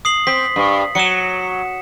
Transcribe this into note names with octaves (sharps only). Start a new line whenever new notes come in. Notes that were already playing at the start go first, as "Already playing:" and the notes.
D#6 C7 F#7
C4 B6
G2
F#3 C#7 E7